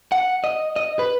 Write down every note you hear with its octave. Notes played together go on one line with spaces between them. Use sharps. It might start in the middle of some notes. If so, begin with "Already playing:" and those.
F#5
D#5
D#5
B4